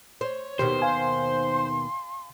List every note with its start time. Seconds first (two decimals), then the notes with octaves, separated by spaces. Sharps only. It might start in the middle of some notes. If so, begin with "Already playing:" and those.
0.21 C5 C#5
0.59 D#2 B2 D#3 G4 C5
0.82 F5 G#5 C6